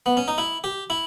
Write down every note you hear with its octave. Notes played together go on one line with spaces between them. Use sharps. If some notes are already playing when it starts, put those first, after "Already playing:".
B3
C#4
D#4
E4
G4
E4